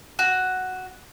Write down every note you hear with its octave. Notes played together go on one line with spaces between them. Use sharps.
F#4